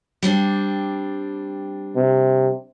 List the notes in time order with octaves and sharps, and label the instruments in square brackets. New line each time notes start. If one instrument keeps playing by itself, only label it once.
[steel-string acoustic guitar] G3 C4 D4
[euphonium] C3